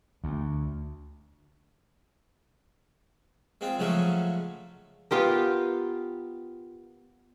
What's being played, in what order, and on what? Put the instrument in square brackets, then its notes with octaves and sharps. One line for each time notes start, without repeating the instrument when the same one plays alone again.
[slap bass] D2
[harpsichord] G#3 C4 F4
C#3 F3 F#3 G#3 A3 C#4
[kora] B3 F4 G4 A#4